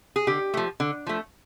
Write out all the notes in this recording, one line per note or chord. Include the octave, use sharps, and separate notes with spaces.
G#4
D3 G4
F3 A3
D3
F3 A3